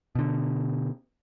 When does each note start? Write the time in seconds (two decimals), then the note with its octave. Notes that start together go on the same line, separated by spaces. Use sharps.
0.15 B2 D3